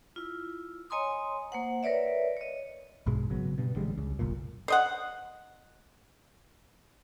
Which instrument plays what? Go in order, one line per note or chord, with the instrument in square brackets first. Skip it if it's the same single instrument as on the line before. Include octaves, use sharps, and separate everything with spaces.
[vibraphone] E4 F4
C#5 D#5 G#5 A#5 C6 D#6
A#3 C5 F#5
A#4 B4 C#5 D5 E5
C#5 D#5
[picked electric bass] A#1 G2 B2 G#3
G#1 C#3 F#3 B3
G2 B2
A1 D3 G3 G#3
C#2
F#1 B1 A#2
[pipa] C5 D#5 F#5